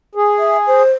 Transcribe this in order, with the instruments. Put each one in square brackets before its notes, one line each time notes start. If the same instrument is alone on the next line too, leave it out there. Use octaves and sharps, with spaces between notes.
[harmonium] G#4
[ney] E5
C5